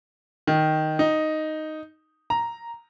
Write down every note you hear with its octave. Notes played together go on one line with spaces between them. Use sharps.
D#3
D#4
A#5